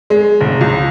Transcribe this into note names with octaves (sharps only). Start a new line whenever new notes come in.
G#3
F1
C#2